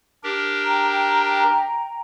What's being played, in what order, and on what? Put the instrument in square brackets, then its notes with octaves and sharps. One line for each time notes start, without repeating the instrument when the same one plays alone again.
[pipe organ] D4 G4 A#4
[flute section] G5 A#5